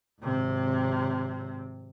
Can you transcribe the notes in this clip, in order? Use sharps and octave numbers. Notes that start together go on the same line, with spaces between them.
G#1 C3